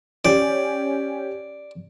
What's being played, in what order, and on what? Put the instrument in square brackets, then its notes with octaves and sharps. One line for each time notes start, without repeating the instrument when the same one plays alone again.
[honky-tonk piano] C#4 G4 [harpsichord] D5